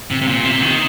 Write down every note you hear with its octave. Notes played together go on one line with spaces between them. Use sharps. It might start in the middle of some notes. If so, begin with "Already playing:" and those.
C3
C3
A#2
C3
D#3